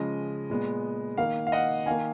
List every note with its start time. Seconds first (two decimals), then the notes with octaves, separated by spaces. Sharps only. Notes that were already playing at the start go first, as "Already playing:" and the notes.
Already playing: C#3 F3 G#3 D#5
0.50 A#2 G#3 B3
1.17 D#3 A#3 F5
1.47 F5
1.52 D#5 F#5
1.86 D#3 A#3 F5 G#5